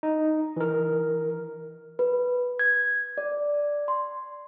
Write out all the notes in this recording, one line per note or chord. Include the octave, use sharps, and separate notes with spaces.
D#4
E3 A#4
B4
G#6
D5
C6